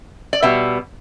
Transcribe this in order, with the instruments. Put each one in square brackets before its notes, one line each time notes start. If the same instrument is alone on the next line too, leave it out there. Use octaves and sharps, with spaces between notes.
[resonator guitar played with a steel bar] D5
B2 G3 B3 E5